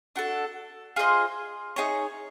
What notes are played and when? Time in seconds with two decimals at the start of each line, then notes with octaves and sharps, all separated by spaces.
0.16 D4 F#4 A4
0.96 F4 G#4 C5 D#5
1.76 D#4 G#4 C#5